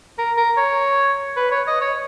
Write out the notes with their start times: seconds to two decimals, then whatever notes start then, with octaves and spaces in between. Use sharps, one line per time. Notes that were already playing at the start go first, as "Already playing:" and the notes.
0.18 A#4
0.37 A#4
0.57 C#5
1.37 B4
1.52 C#5
1.67 D#5
1.81 C#5